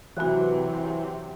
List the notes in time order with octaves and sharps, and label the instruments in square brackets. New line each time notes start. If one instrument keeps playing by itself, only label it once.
[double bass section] C3 F#3 C4 [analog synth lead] E3 [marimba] F#4 F#6